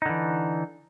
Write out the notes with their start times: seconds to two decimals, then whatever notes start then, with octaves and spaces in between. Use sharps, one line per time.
0.02 D#4
0.06 D3
0.09 E3